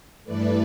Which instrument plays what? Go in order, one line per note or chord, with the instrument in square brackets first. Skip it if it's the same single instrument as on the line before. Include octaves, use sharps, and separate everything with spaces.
[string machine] G2 E3 A3 B4 D5